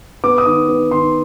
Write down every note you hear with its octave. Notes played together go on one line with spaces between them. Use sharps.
B3 D6
D#6
D#3 D6
B3
D#3 C6